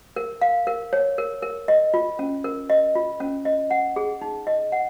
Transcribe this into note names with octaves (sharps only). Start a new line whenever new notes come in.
A#4
F5
A#4
C#5
A#4
A#4
D#5
F4
C#4
A#4
D#5
F4
C#4
D#5
F#5
G#4
D#4
D#5
F#5